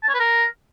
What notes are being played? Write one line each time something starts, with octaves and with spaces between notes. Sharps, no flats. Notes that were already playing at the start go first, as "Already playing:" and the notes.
A5
C#5
B4
A#4